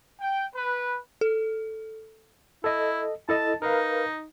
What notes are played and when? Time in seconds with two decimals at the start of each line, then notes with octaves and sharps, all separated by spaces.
0.21 G5
0.56 B4
1.21 A4
2.64 E4 A4 D#5
3.29 E4 A4 D#5 A5
3.62 D#4 A#4 B4 F5